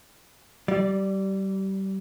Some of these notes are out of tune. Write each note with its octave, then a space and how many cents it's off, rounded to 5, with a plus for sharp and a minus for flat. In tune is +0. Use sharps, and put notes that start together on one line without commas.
G3 -25 D5 +0